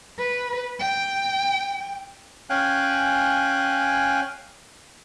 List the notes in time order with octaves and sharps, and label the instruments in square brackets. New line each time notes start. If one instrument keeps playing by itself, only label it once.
[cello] B4
G5
[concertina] C#4 F5 G5 G#5 F#6